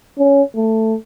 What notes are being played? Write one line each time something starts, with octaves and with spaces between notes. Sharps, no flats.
C#4
A3